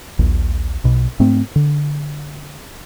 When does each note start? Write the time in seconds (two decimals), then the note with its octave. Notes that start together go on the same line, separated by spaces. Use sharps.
0.19 A#1 D#2
0.84 B1 B2
1.20 G#2 A3 C4
1.56 D3